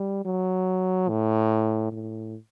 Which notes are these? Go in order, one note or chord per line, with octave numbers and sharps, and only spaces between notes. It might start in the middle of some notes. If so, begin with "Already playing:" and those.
Already playing: G3
F#3
A2
A2